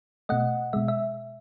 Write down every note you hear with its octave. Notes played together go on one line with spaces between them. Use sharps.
B2 A3 D#5 F#5
B2 G#3 E5
E5